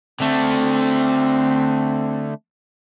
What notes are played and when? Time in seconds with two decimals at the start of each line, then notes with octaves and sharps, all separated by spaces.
0.20 D3 A3 C4